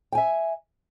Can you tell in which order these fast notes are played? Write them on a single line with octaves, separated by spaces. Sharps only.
G5 G#5 E5